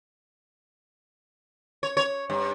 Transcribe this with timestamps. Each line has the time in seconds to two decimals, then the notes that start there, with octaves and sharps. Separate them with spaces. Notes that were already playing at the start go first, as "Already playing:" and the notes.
1.83 C#5
1.97 C#5
2.30 G2